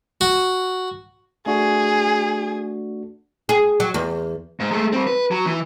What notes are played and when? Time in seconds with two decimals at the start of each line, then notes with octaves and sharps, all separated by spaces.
0.21 F#4
1.46 A3 D4 F#4 G#4
3.49 G#4
3.80 F#3
3.94 E2
4.60 G#2
4.71 G#3 A3
4.93 G3 C4
5.07 B4
5.31 F#3
5.47 E3